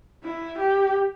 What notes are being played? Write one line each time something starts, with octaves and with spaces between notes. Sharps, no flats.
E4
G4